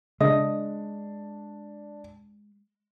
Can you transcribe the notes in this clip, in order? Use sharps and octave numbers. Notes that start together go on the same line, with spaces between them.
C#3 G#3 D4 D#5